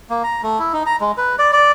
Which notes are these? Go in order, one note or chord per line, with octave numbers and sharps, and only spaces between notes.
A#3
A#5
A3
E4
D#4
A#5
G#3
B4
D5
D5